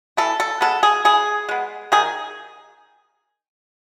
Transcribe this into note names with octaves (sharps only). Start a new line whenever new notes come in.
E3 A4
A4
G#3 B3 A4
G#4
E3 G#4
G#3 B3
D#3 G#4